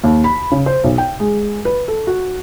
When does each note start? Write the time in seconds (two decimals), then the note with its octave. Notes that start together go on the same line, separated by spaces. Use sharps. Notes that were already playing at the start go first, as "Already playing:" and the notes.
0.04 D#2
0.24 B5
0.52 C#3
0.66 C5
0.84 B1
0.98 G5
1.20 G#3
1.65 B4
1.88 A4
2.07 F#4